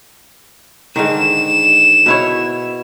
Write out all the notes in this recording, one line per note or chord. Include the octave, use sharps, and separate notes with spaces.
G#2 D3 D#3 E7
B2 E4 C#5